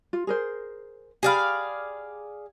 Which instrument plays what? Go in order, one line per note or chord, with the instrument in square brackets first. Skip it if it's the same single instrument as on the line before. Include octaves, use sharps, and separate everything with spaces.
[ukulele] F4
G#4 A#4 C5
[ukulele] G4 B5 [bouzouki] G#4 D5 F5